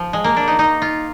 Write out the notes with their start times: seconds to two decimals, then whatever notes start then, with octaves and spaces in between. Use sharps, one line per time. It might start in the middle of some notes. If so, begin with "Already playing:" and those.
Already playing: F3
0.13 G#3
0.24 A#3
0.36 D4
0.48 D#4
0.59 D#4
0.82 F4